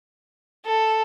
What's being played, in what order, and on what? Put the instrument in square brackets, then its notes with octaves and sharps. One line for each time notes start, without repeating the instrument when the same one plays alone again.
[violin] A4